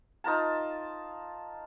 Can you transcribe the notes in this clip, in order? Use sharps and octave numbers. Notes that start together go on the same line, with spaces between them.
D#4 F4 A#4 A5